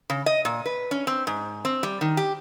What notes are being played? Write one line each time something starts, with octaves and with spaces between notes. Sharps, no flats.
C#3
D#5
A#2
B4
C#4
C4
G#2
C4
G3
D#3
G4